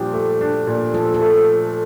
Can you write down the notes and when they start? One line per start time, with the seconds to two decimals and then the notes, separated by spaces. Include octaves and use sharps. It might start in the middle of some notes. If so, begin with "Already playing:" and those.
Already playing: A#2 F3 D4 G4
0.13 A3
0.41 D4
0.67 A#2
0.93 F3 A4
1.14 A4
1.21 A3